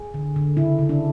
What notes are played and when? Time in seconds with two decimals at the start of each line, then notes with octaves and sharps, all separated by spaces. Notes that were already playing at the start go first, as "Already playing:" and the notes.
Already playing: G#4
0.14 D3
0.36 D3
0.57 C#3 E4
0.79 C#3
0.89 D4